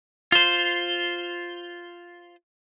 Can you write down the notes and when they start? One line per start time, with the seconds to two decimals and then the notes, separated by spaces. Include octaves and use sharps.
0.32 F4 C5